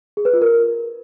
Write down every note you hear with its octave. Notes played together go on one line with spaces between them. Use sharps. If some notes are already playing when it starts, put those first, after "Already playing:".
G#4
B4
F4
A#4